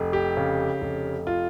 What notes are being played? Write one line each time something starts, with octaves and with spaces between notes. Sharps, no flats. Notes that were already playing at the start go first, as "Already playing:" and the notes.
Already playing: F1
G4
C#3
F1
F4